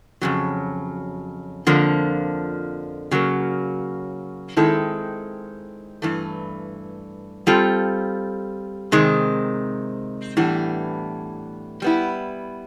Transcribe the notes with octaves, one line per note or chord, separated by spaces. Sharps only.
F2 C#3 F#3
F2 D3 F3 A#3
C#3 F#3 A#3
D#3 G#3 C4 E4 A4
G2 E3 A3
G3 C4 F4 A4
C3 D#3 G#3 C4
A2 E3 G3 B3 D4
G3 B3 E4